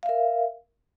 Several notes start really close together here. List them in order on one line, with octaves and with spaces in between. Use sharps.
F5 E5 A#4